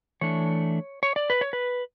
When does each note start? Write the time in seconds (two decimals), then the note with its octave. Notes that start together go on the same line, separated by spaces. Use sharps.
0.21 E3 A3 D4 C#5
1.03 C#5
1.16 D5
1.30 B4
1.41 C#5
1.53 B4